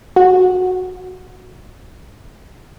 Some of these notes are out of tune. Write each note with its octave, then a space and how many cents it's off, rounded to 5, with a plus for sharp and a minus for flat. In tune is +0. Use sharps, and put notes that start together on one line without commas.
F#4 -10